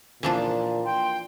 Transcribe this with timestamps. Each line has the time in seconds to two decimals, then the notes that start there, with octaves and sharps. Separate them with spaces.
0.23 A#2 E3 F3 D4
0.84 G5 C6